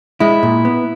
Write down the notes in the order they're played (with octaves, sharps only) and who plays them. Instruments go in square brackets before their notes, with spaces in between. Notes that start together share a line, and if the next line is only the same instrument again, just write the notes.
[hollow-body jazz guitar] G#3 E4
A#2
B3